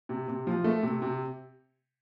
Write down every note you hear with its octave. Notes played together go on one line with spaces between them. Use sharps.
C3
C3
F3
A3
C3
C3